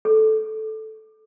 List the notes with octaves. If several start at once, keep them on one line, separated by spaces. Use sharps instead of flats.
A4